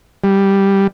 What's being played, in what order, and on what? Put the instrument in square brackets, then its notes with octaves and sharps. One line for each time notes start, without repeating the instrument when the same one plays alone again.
[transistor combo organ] G3